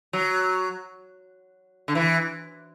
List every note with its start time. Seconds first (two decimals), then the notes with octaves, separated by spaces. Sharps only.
0.13 F#3
1.88 D3
1.95 E3